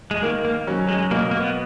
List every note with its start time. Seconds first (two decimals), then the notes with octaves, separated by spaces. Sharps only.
0.11 G#3
0.23 D#3 A#3
0.45 A#3
0.67 F#3 C#4
0.89 G#3
1.11 B2 A#3
1.31 A#3
1.40 B3